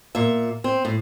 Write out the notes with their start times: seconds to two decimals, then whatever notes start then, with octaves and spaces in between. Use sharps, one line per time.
0.15 A#2 E5
0.64 C4
0.85 A2